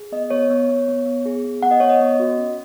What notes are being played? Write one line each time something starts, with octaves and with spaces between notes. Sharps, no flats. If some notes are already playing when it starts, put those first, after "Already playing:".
Already playing: G#4
B3 D#5
B3 C#5
B3
B3
B3
B3
G#4
B3
B3 F#5
D#5
B3 C#5
D#5
B3
F#4
C#4